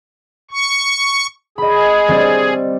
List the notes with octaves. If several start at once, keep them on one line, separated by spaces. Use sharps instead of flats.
C#6
G#4 D#5 B5
G3 C4 D5